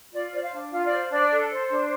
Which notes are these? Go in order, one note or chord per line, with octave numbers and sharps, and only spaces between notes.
F4 D5
C5 D5
F5
D4
F4 F5
D5
C5
D4 D5
A4
C5
D4